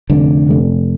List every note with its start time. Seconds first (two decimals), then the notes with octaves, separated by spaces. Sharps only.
0.10 F1 D3
0.49 F1